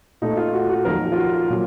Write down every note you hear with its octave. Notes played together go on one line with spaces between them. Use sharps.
A#2 A3 D#4
F4
F#4
F#4
F2 D#3 F#3 A#3 A#4
F4
F#4
A#2 F#3